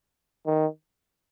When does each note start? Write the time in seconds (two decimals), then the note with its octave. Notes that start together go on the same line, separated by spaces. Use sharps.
0.46 D#3